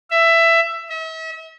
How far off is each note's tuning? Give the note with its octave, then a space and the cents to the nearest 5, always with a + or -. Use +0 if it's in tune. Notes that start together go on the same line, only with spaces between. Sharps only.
E5 +15
E5 -40